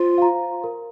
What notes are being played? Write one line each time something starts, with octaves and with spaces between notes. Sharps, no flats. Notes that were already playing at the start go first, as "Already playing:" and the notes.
Already playing: F4 C5
F5 A#5
A#4